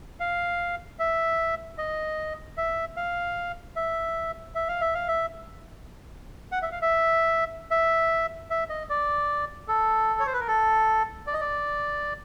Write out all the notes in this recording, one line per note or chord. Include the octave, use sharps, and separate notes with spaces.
F5
E5
D#5
E5
F5
E5
E5
F5
E5
F5
E5
F#5
E5
F5
E5
E5
E5
D#5
D5
A4
C#5
C5
B4
A#4
A4
D5
D#5
D5